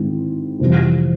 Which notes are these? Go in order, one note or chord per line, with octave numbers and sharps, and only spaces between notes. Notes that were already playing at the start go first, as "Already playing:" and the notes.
Already playing: G#2 D#3 G#3 C4 E4
F2 C3 E3 G3